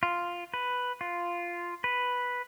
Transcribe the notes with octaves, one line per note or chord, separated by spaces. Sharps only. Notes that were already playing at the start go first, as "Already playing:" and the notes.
F4
B4
F4
B4